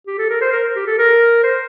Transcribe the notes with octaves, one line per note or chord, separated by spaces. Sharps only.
G4
A4
A#4
C5
A#4
G4
A4
A#4
C5